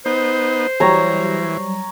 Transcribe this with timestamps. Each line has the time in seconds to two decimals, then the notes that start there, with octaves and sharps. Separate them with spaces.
0.06 B3 D#4 C5
0.80 E3 F#3 G3 C#5 A#5